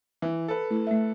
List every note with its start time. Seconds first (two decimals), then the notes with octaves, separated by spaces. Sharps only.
0.22 E3 E5
0.48 A4 B4
0.71 A3 E4
0.87 A3 E5